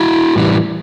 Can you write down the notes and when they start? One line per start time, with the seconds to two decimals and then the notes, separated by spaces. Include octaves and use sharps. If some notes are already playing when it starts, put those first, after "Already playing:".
Already playing: E4 F#4
0.36 A2 E3 G3